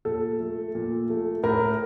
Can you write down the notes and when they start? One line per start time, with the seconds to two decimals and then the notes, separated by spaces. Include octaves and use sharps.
0.05 A#2 A4
0.40 A3
0.75 A#2
1.10 A3
1.43 A2 A#4